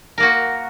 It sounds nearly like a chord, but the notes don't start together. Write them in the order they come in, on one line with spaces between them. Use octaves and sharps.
A#4 A#3 F#4